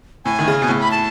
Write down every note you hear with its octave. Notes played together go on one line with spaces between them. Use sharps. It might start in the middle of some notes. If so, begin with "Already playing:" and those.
A2 G#5
D#3
C#3
B2
A2
B5
A5